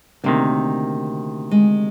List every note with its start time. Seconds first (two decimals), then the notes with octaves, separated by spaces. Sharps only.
0.24 D2 C3 D#3 A#3
1.51 G#3